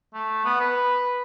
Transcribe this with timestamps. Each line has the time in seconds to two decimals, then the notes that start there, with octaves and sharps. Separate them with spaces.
0.14 A3
0.45 B3
0.60 B4